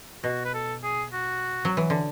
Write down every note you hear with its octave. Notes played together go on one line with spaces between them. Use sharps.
B2 F#4
B4
A4
G#4
F#4
F#3
E3
D3